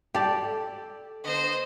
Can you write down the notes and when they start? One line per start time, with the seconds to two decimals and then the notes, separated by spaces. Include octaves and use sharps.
0.15 G4 A4 D5
1.24 D3 B3 C5 D#5